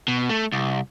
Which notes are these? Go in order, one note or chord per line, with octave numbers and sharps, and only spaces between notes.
B2
A3
C2